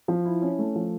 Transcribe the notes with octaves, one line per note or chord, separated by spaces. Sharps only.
F3
E4
C#4
A3
F3